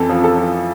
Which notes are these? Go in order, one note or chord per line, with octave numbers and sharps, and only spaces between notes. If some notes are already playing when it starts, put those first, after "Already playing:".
Already playing: F2 E3 A4
F3
A4
F3